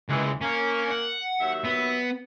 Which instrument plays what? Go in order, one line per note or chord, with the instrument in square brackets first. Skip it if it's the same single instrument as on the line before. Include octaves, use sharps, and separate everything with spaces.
[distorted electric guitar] C#2 [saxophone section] A#2 E3 G#3
[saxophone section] A#3 [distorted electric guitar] C#4
[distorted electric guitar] F#5
[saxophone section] D#2 F#3 E5
[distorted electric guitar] B3